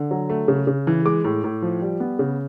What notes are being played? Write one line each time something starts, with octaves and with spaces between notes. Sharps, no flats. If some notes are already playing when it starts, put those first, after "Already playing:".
Already playing: D3
F#3
A3
C#3
C#3
E3
G#3 D6
A2
A2
F3
G3
B3
C#3